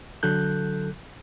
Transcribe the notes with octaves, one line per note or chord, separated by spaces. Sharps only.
D3 F#3 A4 F#6 G6